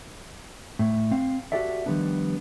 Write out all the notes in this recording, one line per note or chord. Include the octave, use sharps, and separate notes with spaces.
A2
C4 F5
F#4 G4 A4 D5 E5
D#3 F3 G3 B3 D4